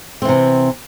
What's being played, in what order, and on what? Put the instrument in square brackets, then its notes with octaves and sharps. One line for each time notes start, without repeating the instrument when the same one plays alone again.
[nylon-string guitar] C4
E3
C3